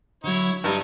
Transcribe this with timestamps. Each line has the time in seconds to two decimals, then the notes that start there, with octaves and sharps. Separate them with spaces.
0.24 D3 F#3 E4 C#5
0.64 G2 D#4 E4 D5 D#5